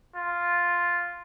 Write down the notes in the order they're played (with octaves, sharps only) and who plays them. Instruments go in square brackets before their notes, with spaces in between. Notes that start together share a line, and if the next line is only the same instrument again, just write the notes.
[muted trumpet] F4